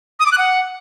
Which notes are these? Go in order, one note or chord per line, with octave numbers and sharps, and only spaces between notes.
D#6
D6
F#6
F#5